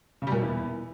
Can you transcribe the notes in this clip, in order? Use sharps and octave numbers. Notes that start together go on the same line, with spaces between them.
C#3
G3
A#2
B2
E2